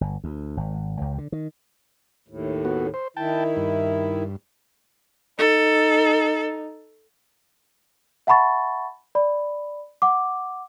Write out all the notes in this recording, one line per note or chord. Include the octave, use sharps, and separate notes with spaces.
G1
D2
G#1
C#2
D3
D#3
D#2 A2
B3 F#4
C5
D#3 E4 G5 A5
G2
D#4 A4
E5 F#5 A5 B5 C#6 A6
D5 B5
F#5 D6